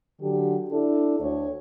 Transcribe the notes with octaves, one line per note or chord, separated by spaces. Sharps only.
D3 F#3 G4
D4 E4 A4
D2 C#5